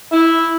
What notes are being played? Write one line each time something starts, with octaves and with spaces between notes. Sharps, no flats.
E4